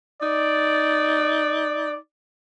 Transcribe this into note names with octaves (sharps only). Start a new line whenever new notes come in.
D#4 D5